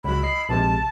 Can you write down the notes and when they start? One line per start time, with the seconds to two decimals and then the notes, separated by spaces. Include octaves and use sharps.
0.04 C#2 F#3 B5
0.23 D#5 C7
0.49 A#1 C3 G#3 A5